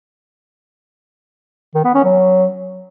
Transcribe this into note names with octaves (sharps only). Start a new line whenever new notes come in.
D#3
B3
C#4
F#3